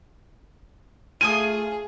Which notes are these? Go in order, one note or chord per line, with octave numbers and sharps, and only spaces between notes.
A3 F4 G#4 G#5 D#6 D#7